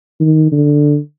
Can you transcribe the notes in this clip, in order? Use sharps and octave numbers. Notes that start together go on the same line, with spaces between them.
D#3
D3